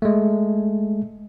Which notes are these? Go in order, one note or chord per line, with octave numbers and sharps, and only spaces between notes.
G#3 A3